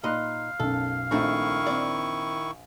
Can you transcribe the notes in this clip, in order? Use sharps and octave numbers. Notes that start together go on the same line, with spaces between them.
A#2 D#4 D#5 F5 B5 C6 F#6
B1 F#2 A4
A#1 D#3 A3 C4 D#4 E4 C#6
C4 D5